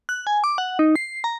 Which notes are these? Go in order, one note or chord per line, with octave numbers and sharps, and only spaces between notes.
F#6
G#5
D6
F#5
D#4
C7
A#5